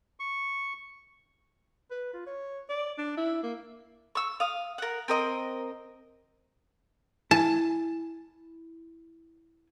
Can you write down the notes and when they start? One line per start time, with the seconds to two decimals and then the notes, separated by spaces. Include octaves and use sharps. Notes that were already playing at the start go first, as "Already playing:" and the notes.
0.20 C#6
1.91 B4
2.13 F4
2.27 C#5
2.69 D5
2.98 D4
3.17 E4
3.43 A#3
4.15 C#6 E6
4.40 F5 D#6
4.78 A#4 F#5
5.08 C4 A#4 D#5
7.31 E4 G#5 A5